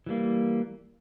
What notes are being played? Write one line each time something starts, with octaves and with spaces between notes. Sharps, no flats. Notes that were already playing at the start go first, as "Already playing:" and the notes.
E3 G3 A#3